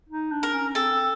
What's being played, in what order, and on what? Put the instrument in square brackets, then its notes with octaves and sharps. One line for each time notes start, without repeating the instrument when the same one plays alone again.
[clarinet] D#4
D4
[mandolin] A#4
[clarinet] C#4
[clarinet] C4 [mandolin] A4
[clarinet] C4